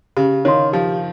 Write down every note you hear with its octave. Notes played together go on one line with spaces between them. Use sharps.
C#3 G4
D#3 C#5 F5 C6
F3 G4